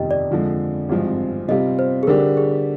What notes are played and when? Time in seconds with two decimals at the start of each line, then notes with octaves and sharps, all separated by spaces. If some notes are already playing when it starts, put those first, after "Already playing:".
Already playing: G1 F2 C3 D#3 G3 D#5 G5
0.11 D5
0.31 F2 D3 F3 G#3
0.89 G#1 G2 F3 G#3 C4
1.48 C3 G3 C4 F4 D#5
1.79 C5
2.03 G#4
2.07 D3 G3 D4 G4 A#4
2.37 G#4